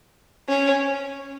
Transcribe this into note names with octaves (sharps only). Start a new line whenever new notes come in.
C#4